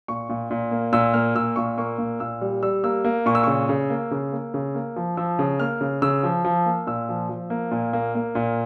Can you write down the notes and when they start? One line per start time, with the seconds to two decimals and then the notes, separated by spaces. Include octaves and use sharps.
0.08 A#2 C#6
0.29 A#2
0.51 A#2
0.71 A#3
0.92 A#2 E6
1.14 A#3 F6
1.35 A#2 E6
1.56 A#2 C#6
1.78 A#3 C#6
1.98 A#2
2.20 A#2 E6
2.41 G3
2.63 G3 E6
2.84 A#3 E6
3.04 A#3
3.26 A#2 C#6
3.35 E6
3.44 C#3 C#6
3.69 C#3
3.90 A#3
4.11 C#3
4.32 A#3
4.54 C#3
4.75 A#3
4.96 F3
5.17 F3 E6
5.39 C#3
5.60 A#3 F6
5.81 C#3
6.02 C#3 E6
6.23 F3
6.45 F3
6.66 A#3
6.87 A#2 E6
7.09 F3
7.29 F3
7.50 A#3
7.71 A#2
7.93 A#3
8.15 A#3
8.35 A#2